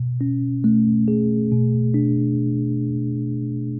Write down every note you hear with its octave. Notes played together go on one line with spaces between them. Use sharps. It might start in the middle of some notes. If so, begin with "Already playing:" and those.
Already playing: B2
C#4
A3
G#4
B2
D4